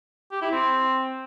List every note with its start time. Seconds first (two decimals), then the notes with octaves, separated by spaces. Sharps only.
0.31 G4
0.41 E4
0.52 C4